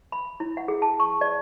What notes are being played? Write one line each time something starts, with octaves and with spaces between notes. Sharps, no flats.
B5
E4
F#5
G#4
A5
C#6
D5